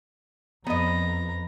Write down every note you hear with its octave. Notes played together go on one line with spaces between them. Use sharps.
F2 B3 D#5 A#5